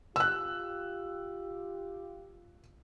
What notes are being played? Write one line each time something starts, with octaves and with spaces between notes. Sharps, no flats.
F4 G4 E6 F#6